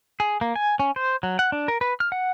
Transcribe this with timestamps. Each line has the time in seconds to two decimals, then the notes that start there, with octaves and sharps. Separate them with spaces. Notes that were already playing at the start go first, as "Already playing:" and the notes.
0.20 G#4
0.41 A#3
0.56 G#5
0.80 C#4
0.96 C5
1.23 F#3
1.39 F#5
1.52 D4
1.68 A#4
1.81 B4
2.00 F6
2.12 F#5